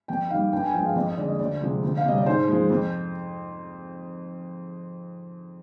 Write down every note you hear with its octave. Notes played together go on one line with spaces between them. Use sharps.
F2 G5
D#3 G3 F5
G2 G5
G#5
F3 G#3 G5
F5
F2 D#5
D#5
D3 G#3 D5
D#5
D2 D5
C3 F3 G#3
D2
F5
C3 G3 D#5
D5
G#2 C5
F3 G#3
F2